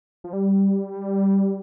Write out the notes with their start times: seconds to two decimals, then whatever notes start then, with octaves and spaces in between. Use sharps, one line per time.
0.24 F3
0.33 G3